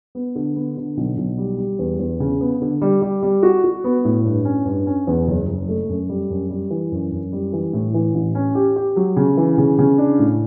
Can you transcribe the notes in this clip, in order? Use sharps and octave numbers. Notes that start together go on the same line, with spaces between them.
B3
D3
B3
D3
B1
B1
G3
G3
E2
E2
C#3
B3
D3
G3
G3
G3
F#4
F#4
B3
A2
G2
C#4
G2
C#4
E2
F#1
F#1
A3
F#2
G3
F#2
G3
E3
F#2
F#2
G3
E3
A2
E3
A1
C#4
G4
G4
F#3
C#3
E3
C#3
C#3
D4
A2